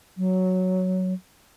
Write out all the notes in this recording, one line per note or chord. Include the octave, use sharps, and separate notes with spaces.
F#3